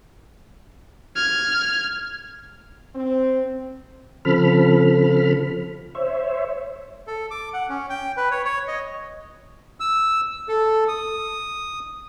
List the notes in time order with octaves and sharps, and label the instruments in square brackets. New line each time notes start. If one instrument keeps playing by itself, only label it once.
[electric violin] F6 G#6
[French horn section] C4
[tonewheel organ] C#3 F3 C4 A4 B5 F6
C5 C#5 E5
[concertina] A4
D6
F#5
C#4
G5
B4
C#5
C#5
D#5
[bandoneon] E6
A4
D#6